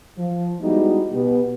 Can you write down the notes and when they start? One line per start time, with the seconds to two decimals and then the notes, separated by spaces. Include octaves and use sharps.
0.18 F3
0.60 G3 G#3 B3 D#4 E4 F#4
1.12 B2 B3 G4